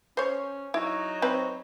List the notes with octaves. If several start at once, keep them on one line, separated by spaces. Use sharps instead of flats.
C#4 C5 C#5
F#3 D#4 E4 C#5
C4 B4 C5